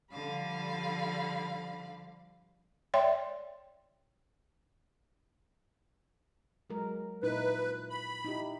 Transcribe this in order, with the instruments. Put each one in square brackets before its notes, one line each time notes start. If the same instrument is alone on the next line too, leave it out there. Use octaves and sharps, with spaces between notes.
[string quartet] D3 F3 G3 F5 B5
[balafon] C#5 D5 E5 G5 C6
[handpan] F#3 G#3 A#4
[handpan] A#2 D#4 E4 [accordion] B4
[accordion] B5
[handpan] D#4 E4 G4